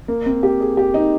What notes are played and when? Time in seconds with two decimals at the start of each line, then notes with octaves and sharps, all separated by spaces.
0.08 A#3
0.26 C4
0.43 G4
0.60 G#4
0.77 G4
0.94 D#4